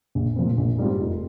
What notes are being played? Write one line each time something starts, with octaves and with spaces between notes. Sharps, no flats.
A#1
A#2 F3 C4
A#1
G#2 G3 C4 F4
F1